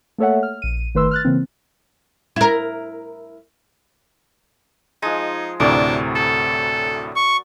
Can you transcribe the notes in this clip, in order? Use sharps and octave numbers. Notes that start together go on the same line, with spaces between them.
A3 A#3 A4 C#5 E5 F#5
F6
A#1 D#7
G1 D#3 A3 B4 C6 E6
F6 F#6 A6
C#3 E3 A#3 C4
E4 A#4
F3 G#3 D#4
D2 A2 C3 F#3 D4 A#4 D5
A4
C#6